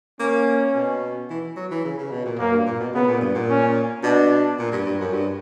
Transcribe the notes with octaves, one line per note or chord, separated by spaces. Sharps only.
A#3 C#4
B2
E3
F#3
E3
C#3
C#3
B2
A#2
F#2 A#3
G2
A#2
B2
C#3 B3
A#2
G2
A#2
C#4
B2 D4
A#2
G2
G2
F#2
G2